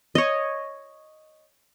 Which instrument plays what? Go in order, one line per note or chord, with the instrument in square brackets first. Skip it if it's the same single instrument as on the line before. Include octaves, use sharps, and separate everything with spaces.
[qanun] C#5 D#5